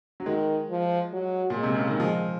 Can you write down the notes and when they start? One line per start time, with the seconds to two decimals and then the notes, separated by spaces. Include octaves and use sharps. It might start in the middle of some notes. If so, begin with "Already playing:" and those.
0.20 F#3
0.26 D#3 G#3
0.69 F3
1.13 F#3
1.50 A#2
1.56 G#3
1.63 C3
1.75 C#3
1.87 D#3
2.00 F3